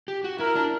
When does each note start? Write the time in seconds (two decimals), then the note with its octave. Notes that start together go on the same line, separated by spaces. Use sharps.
0.08 G4
0.24 F#4
0.39 E4 A#4
0.55 D4